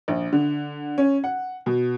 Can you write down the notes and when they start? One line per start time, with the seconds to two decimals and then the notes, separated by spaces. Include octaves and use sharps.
0.08 A#1
0.33 D3
0.98 C#4
1.24 F#5
1.66 B2